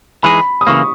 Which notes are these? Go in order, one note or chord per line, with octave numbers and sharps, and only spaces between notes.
E3 G#3 D#4 G#4 B5
D#6
C#3 E3 A#3 C#6